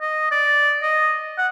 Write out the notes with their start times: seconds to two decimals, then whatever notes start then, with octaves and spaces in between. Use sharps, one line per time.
0.01 D#5
0.31 D5
0.82 D#5
1.38 F#5